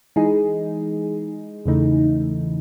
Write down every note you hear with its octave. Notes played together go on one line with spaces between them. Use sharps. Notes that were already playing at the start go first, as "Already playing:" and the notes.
E3 G#3 D#4 G#4
E2 C#3 E3 A3 D#4